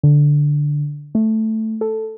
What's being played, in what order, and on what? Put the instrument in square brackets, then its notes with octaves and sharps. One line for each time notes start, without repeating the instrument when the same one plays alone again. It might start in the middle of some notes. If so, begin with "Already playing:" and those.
[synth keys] D3
A3
A4